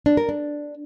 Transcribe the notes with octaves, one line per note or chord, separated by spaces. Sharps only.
D4
A#4
D4